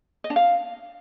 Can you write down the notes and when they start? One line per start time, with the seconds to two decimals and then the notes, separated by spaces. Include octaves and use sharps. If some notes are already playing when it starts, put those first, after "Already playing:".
0.24 D#5
0.30 D4
0.36 F5